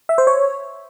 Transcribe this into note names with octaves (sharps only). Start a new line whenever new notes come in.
E5
C5
C#5